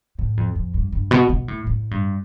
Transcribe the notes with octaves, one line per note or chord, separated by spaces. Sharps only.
A2
F2
F2
G2
G2
B2
B2
A2
A2
G2